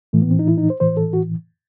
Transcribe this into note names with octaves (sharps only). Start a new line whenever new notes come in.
A2 E3 A3
B3
C4
D#4
E4
D#4
C5
A2 E3 C5
A4
F#4